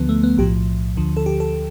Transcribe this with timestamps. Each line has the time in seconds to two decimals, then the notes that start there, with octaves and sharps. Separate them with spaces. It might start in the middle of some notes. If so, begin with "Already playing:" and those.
Already playing: D2 D3 F3 B3
0.09 A3
0.23 B3
0.38 B1 A2 F3 G4
0.97 D2 D3 F3
1.17 A4
1.26 G4
1.40 A4